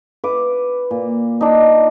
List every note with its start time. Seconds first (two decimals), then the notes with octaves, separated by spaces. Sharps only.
0.24 B4 D6
0.91 A#2
1.41 D4 D#4